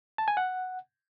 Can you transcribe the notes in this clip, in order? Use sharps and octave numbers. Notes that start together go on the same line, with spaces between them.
A5
G#5
F#5